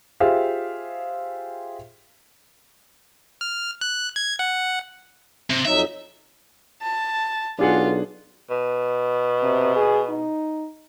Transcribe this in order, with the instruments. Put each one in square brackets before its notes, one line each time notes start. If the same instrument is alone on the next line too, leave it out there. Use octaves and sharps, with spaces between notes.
[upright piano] F4 G4 G#4 C5 E5 F5
[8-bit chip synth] F6
F#6
G#6
F#5
[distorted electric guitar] C3
[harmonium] F2 F#3 D#4 [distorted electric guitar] E5
[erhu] A5
[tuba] B1 [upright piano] D4 G#4 F#5 [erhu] F4
[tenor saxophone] B2
[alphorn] C3
G#4
D#4